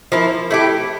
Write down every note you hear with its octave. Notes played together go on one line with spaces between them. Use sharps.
F3 A#3 E4
A3 E4 G4